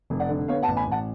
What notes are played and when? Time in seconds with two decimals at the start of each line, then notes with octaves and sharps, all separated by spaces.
0.10 F1
0.20 D5 F#5
0.29 D3
0.48 B3 C#5 F5
0.62 F#5 A5
0.68 A1
0.77 G#5 B5
0.87 A1 F#5 A5